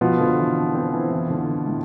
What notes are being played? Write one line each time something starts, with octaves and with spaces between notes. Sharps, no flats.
B2 F3 B3 F4
D3
E3
C4
C4
E3
E3
D3
A2